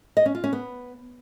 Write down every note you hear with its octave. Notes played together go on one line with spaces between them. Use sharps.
D#5
C#4
F4
C#4
B3